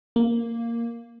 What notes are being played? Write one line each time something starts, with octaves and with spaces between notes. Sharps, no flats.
A#3